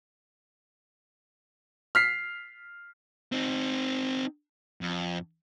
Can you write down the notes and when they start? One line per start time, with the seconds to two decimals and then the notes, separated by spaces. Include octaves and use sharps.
1.95 F6 B6 C7
3.32 C4 D#4
4.81 F2